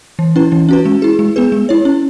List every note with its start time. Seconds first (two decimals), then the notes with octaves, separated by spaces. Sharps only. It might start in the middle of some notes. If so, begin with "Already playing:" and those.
0.19 E3
0.36 C#4 E4 B4
0.52 E3
0.69 C#4 F#4 B4
0.85 G#3
1.02 E4 G#4
1.19 G#3
1.36 B3 G#4 B4
1.52 G#3
1.69 E4 C#5
1.85 C#4